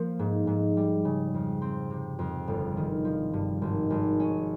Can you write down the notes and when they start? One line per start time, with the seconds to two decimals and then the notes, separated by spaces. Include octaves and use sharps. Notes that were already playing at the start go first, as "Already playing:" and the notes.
Already playing: F3 A#3
0.19 G#2
0.47 G#2
0.77 G3
1.05 C#3
1.34 F2
1.61 C4
1.90 C3
2.19 F2
2.48 G1
2.77 D#3
3.05 F3
3.33 G2
3.62 G#1
3.90 G#1
4.20 C#4